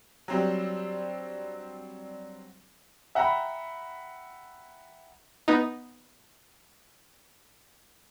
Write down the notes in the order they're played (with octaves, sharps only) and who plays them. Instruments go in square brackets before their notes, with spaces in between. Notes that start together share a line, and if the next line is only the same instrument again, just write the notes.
[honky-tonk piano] F#3 G3 C4 D4 G4
[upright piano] E5 F#5 G5 A#5 B5
[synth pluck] B3 D#4